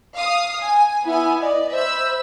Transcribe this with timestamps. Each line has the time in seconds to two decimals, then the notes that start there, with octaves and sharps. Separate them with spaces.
0.15 F5 D#6
0.61 G#5
1.05 B3 E4 G#5
1.41 D5 D#5
1.72 C5 E5 B5 E6